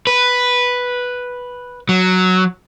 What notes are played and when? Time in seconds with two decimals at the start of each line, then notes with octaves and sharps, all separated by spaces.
0.07 B4
1.89 F#3